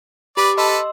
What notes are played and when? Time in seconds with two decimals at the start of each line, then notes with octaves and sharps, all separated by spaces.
0.37 G4 B4 D5 D6
0.58 A4 B4 D#5 C6 E6